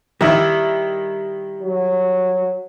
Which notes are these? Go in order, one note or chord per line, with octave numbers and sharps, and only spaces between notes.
D#3 G3 E4
F#3